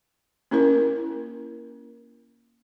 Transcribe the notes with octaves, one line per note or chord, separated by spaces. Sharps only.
A#3 C#4 E4 A#4